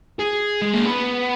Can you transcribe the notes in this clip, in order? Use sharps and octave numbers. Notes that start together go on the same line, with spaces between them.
G#4
G#3
A#3
B3